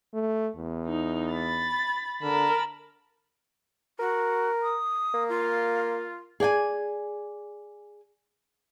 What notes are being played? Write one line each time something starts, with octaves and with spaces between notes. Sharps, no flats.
A3
E2
D#4
B5 A6
D3 A#4 A5 B5
F#4 A#4
D#6
A#3
F4
G#4 D5 G5 G#5